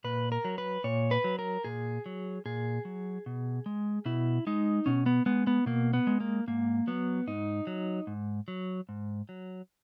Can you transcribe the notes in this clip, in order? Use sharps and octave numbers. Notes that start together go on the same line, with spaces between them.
A#2 B4
A#4
F#3
B4
A#2 C#5
B4
F#3
A#4
A#2 G#4
F#3
A#2 G#4
F#3
B2
G#3
B2 E4
G#3 D#4
B2 C#4
B3
G#3 B3
B3
B2 A#3
B3
G#3
A#3
G#2 A#3
F#3 B3
G#2 D#4
F#3
G#2
F#3
G#2
F#3